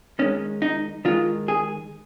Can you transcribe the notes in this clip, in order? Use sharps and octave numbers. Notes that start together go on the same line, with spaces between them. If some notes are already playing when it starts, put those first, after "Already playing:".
D#3 G#3 C#4
D#4
D#3 G#3 F4
G#4